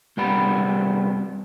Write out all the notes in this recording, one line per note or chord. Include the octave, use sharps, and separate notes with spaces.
C2 F#2 G3 B3 B5